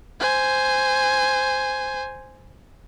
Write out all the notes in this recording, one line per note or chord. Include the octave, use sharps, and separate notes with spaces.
C5 G#5